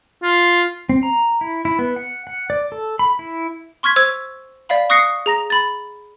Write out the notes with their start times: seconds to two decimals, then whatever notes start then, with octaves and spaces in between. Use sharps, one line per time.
0.23 F4
0.89 C4
1.03 A#5
1.41 E4
1.65 E4
1.79 B3
1.96 F#5
2.27 F#5
2.50 D5
2.72 A4
2.99 B5
3.19 E4
3.83 C6 C#6 F6 G#6 B6
3.96 C5 E6 G#6
4.69 D5 E5 F5 B5
4.90 C#6 D#6 F#6 A#6 C7 C#7
5.26 G#4 A#5 A#6
5.50 B5 A6